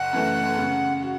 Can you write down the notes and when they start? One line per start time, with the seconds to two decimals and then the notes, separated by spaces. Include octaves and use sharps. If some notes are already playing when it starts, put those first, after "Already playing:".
Already playing: F#1 F#5
0.13 F#2 E3 A3
0.57 C#3
1.02 F#4